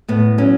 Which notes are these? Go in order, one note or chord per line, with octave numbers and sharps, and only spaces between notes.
A2 B3
F#3 C#4